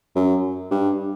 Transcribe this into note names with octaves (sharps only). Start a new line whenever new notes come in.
F#2
G2